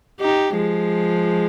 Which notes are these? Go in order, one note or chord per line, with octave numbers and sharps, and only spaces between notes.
D#4 G4
F3 G#3